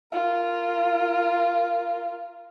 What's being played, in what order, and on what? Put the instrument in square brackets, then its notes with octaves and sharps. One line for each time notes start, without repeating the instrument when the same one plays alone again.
[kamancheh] F4 A#4